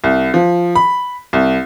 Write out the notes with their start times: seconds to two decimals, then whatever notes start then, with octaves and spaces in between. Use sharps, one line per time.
0.04 C2
0.34 F3
0.76 B5
1.33 C2